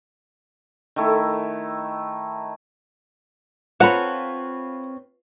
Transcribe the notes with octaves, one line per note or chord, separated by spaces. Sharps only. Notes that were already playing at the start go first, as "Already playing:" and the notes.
D#3 A3 E4
C4 F4 A4 B4 C#5 F#5 A#5